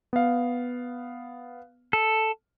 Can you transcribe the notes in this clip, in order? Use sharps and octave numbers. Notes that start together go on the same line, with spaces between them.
B3 F5
A4